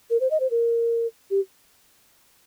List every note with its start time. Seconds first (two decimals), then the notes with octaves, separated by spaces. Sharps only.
0.10 A#4
0.21 C5
0.31 D#5
0.40 C5
0.51 A#4
1.31 G4